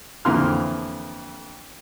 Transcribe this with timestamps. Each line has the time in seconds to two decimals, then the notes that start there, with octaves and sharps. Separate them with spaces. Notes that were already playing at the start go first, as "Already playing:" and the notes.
0.25 F2 D3 E3 A#3 C6 F6